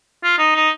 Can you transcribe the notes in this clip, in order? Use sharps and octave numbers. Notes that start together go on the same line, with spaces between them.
F4
D#4
D#4